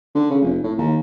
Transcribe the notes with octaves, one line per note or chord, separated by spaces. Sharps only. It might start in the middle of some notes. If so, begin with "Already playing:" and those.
D3
C#3
F1
A2
D#2